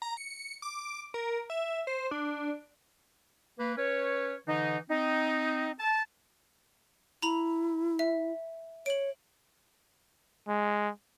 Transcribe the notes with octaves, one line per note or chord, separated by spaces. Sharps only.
A#5
C#7
D6
A#4
E5
C5
D4
A#3 B4
C#4 B4 C#5
D3 E3 D#4
C4 D#4
A5
E4 A#5 B5 F7
E5
C#5 D7 F#7
G#3